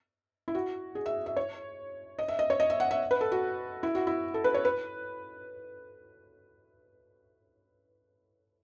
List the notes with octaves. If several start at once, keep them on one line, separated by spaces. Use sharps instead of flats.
E4
F#4
G#4
E5
E5
C#5
D#5
E5
D#5
C#5
D#5
E5
F#5
E5
B4
A4
F#4
E4
F#4
E4
A4
B4
C#5
B4